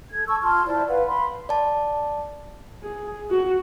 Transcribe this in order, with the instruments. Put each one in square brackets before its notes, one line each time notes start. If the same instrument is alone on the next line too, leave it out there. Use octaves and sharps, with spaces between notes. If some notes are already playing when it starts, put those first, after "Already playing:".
[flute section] A4 G#6
A5 C#6 E6
F4 A5 C6 F6
E4 C5 D5 A5
B4 F5 F#5
B5 C6
[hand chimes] D5 A5
[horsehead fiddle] G#4
F#4